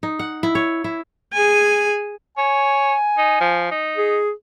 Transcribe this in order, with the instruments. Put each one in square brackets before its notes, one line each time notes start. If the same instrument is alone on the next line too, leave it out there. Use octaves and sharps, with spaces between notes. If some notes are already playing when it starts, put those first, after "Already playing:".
[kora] D#4
F#5
E4
C#5
E4
[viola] G#4 G#5
[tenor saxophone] C#5 [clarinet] G#5
[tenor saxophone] D#4
F3
D#4
[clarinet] G#4